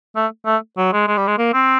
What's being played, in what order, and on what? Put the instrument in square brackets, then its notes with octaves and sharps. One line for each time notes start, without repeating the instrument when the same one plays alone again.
[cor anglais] A3
A3
F#3
G#3
G#3
G3
G#3
A#3
C4